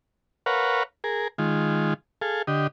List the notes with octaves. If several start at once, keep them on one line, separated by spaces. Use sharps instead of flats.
A#4 B4 C#5 F5 F#5
G#4 A#4
D#3 G#3 F4
G#4 A4 F5
D3 G4 D#5